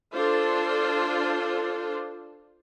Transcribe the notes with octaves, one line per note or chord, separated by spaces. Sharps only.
D4 F4 A4 C5